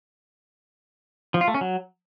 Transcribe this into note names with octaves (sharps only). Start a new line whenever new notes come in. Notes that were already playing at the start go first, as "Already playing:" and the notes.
F3
F4
A3
C#4
F#3